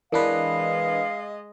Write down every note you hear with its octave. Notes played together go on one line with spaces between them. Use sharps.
E3 G#3 D4 A#4 B4 D#5 F5